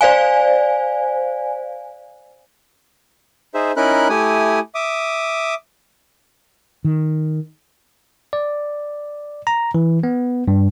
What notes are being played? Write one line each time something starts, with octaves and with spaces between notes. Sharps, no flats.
C5 D5 F5 G#5
D#4 G#4 C5 E5
C#4 D#4 E4 A#4 B5 F#6
A3 E4 G4 G#5 D#6
E5 D6 D#6
D#3
D5
A#5
E3
B3
G2